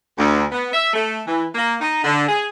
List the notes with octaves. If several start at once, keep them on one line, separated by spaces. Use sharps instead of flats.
D2
B3
E5
A3
E3
A#3
D#4
D3
G#4